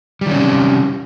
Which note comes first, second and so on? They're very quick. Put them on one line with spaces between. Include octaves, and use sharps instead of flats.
G3 D#3 C#4 C3